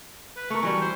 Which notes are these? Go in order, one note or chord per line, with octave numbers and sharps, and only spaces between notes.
B4
A3 A#4 C#6
E3 F#3 G3
C5